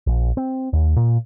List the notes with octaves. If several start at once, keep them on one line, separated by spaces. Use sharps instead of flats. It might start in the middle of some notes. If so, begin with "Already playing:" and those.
A#1
C4
D#2
A#2